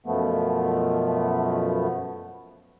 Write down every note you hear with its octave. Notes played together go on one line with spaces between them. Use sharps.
F#2 B2 F3 A3 B3